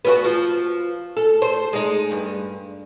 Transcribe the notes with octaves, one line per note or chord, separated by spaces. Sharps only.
B3 C4 F#4
F3
A4
C5
G#3 D#4
G2